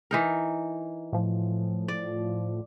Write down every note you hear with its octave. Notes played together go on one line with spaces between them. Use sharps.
E3 D#4 A#4
A2 F3
D5